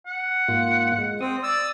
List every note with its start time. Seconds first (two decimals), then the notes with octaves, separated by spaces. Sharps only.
0.06 F#5
0.48 G#2 A#3 F4
0.98 G#3
1.21 C4 D#6
1.43 D5 E6